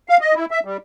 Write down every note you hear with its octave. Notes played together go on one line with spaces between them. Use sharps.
F5
D#5
E4
E5
G3